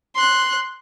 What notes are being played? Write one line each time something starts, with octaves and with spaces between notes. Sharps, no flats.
C6 F#6